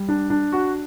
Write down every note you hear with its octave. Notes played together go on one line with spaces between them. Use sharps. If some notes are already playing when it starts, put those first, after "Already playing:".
Already playing: G3
D4
D4
F#4